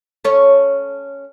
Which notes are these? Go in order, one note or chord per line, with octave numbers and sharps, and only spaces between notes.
C#4 A4 C#5